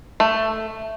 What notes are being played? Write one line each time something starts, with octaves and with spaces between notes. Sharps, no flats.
A3